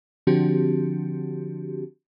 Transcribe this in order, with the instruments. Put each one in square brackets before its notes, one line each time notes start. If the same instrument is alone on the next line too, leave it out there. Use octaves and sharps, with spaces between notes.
[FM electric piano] D3 F3 C4 D4 F#4 G4